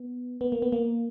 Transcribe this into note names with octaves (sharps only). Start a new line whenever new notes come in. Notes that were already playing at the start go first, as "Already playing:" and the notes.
Already playing: B3
B3
A#3
B3
A#3